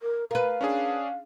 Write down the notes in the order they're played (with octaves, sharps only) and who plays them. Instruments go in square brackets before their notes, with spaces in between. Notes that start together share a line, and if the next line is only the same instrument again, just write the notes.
[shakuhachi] A#4
[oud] A#4 B4 [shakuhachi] F5
[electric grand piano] C#4 D4 G#4